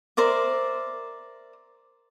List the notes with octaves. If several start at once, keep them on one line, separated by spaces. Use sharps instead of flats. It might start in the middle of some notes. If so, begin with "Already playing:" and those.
A#4 C5 D5 E5